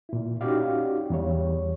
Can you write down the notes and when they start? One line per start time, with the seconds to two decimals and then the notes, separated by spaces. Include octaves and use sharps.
0.09 A#2 E4
0.41 C#4 D#4 F#4 G4 D5 F5
1.10 E2 G3 C#5